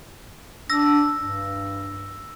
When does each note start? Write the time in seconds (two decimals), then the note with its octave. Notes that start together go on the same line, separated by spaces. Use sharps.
0.70 D4 E6 A#6
1.18 G2